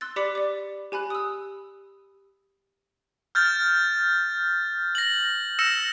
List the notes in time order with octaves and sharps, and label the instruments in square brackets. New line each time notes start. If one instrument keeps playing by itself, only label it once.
[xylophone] C6 E6 F#6 A6
G4 D5 B5 D6 B6 C#7
D5 D6
G4 G#5 B5 F#6
D#6 E6
[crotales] F6 G6 A6
A#6 F#7
E6 A#6 C#7 E7